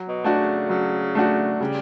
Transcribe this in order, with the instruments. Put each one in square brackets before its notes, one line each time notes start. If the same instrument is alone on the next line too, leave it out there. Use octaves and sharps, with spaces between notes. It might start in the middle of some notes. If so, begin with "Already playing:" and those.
Already playing: [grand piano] F#3
[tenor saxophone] B2
[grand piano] A3 D4 F#4
[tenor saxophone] C#3
[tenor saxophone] C#3 [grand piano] F#3
[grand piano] A3 D4 F#4
[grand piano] C#3 [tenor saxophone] G3